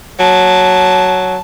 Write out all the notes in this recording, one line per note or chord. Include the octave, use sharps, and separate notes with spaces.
F#3 A5